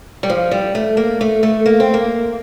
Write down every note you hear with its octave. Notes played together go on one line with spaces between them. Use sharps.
G3
F3
G3
A3
A#3
A3
A3
A#3
C4
A#3